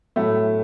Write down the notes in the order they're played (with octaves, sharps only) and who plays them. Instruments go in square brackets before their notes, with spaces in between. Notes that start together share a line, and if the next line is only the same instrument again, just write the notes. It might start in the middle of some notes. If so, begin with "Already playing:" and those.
[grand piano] A2 F#3 A3